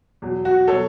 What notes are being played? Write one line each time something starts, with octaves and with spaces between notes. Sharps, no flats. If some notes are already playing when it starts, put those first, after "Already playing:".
E2 B2 F#3
F#4
B2 F#3 A4 C#5